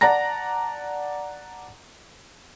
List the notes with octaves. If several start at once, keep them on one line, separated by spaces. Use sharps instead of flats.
D5 F#5 A5 A#5 A#6